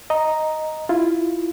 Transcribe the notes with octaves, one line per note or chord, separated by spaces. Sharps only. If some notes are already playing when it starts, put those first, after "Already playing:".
D#5 A#5
E4 F4